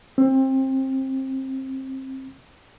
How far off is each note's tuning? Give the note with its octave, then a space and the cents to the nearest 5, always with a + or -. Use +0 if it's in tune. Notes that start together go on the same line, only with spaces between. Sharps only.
C4 +25